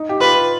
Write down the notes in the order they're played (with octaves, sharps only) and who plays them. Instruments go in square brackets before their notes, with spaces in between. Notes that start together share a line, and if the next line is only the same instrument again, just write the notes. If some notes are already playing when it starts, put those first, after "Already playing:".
Already playing: [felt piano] D#4
G4
[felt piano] F4 [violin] B4